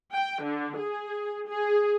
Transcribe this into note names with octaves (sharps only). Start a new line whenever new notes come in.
G5
D3
G#4
G#4